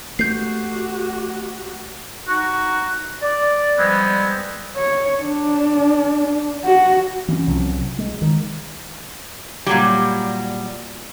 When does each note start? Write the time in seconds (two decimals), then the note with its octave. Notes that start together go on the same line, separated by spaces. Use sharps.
0.19 A3 F#4 G4 G6 C7
2.28 D#4 F#4
3.22 D5
3.78 F3 G3 G#3 B3 C4
4.76 C#5
5.22 D4
6.65 F#4
7.28 E3 C#4
7.47 C2 C3 F3 F#3
7.99 G#3
8.22 D#3
9.66 A#2 F#3 G3